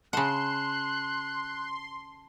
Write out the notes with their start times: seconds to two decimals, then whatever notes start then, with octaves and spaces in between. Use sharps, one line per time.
0.13 C#3 F#5 A5 C6 F#6 E7